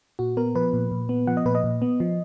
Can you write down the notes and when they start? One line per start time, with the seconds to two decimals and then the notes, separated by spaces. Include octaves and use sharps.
0.19 A#2 F#4
0.37 B3 A#4
0.55 F3 B4
0.73 A#2
0.92 A#2
1.09 B3
1.27 F3 F#5
1.37 D#5
1.45 A#2 B4
1.55 D#5
1.64 A#2
1.82 B3
2.00 F3